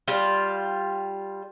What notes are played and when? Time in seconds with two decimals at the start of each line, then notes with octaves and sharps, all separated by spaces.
0.08 G3 F4